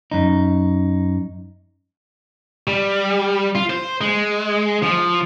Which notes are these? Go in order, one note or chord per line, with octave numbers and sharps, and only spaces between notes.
F#2 D#4
G3
F4
C5
G#3
F3